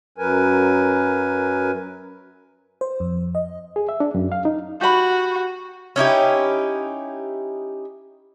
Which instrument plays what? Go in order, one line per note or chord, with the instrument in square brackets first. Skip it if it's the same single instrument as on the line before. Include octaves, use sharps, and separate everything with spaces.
[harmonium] F#2 F#3 A#4 B4 G#5
[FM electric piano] C5
F2
D#5
[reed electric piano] G#4
E5
D4
F#2
F5
D#4
[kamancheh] F#4 [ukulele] G4 B5
[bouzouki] C#4 D#4 E4 G4